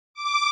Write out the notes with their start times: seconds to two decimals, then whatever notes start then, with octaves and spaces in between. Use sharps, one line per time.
0.14 D6